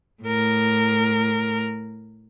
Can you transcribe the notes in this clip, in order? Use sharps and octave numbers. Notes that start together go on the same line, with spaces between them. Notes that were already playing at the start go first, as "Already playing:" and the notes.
A2 A#4